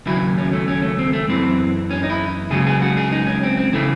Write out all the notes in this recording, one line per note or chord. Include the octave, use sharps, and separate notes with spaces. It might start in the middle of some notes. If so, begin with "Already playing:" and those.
D#2 C#3 F#3 E4
C#4
A3
C#4
A3
C4
A3
F#2 E3 C4
C#4
D#4
E4
C#2 C#3 F#3 G#4
G#4
F#4
G#4
D#4
C#4
C4
C4
C#3 E3 A3